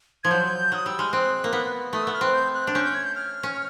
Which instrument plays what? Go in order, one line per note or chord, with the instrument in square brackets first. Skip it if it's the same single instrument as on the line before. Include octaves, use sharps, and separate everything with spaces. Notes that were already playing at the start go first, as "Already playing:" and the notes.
[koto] F3 [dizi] G#6
[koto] F#3 [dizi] G6
[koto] F#3 [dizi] D#6
[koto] G3 [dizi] E6
[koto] G#3 [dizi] F6
[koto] C4 [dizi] F#6
[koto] A#3
B3
[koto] A3 [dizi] D#6
[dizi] E6
[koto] B3
[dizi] F6
[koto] C4 [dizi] F#6
[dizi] G6
F#6
[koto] D4
[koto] C#4 [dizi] G6
[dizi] G6
G#6
G6
F6
[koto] C#4